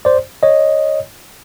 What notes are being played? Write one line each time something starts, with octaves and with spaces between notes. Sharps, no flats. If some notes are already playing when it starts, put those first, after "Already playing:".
C5 D5
C#5 D#5